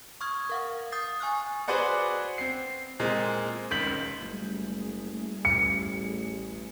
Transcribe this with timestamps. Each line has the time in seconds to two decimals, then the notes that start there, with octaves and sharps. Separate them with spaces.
0.21 C#6 D#6 F6 G#6
0.50 A#4 F5 F#5
0.92 D#6 G6 A6 C7
1.20 G#5 C#6 F6 F#6
1.68 F#4 G#4 B4 C5 D5 F#5
2.38 C4 C7
3.00 A#2 G#3 C4
3.71 F1 C#2 D#3 G6 B6 F#7
4.20 F#1 G3 A3 G#4
5.45 A1 C#7